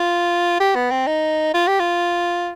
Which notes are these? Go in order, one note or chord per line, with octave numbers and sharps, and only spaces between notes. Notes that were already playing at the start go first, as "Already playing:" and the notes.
Already playing: F4
G4
B3
C4
D#4
F4
G4
F4